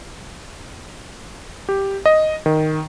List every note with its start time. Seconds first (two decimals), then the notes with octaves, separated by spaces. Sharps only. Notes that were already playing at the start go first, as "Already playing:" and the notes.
1.69 G4
2.06 D#5
2.46 D#3